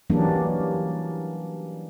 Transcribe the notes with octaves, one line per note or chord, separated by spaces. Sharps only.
E3 F#3 G3 A#3 C#4 D4